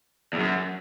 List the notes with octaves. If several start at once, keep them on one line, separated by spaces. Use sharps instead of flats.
E2
F#2